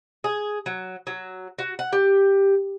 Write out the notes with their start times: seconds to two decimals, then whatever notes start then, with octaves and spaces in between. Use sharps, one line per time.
0.24 G#4
0.66 F#3
1.07 F#3
1.59 F#4
1.79 F#5
1.92 G4